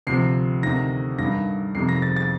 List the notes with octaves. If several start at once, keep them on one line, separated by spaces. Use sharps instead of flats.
D2 C3 F3 C7
D2 C3 D#3 A#6
G2 D#3 A#6
F2 C3 D#3 C7
A#6
A6
A6